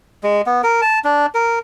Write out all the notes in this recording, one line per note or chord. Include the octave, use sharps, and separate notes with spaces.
G#3
B3
A#4
A5
D4
A#4